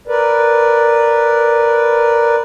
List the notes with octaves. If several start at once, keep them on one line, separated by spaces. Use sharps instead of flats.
A#4 B4 D5